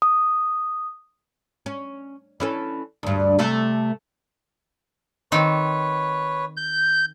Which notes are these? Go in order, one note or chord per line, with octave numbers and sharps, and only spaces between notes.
D#6
C#4
E3 C#4 A4
D2 G2
C3 A3 A4
D#3 C4 B4 C#5
G6